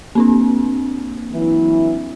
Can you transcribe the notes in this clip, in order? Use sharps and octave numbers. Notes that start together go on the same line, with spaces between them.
A#3 C4 D4
E3 F#3 E4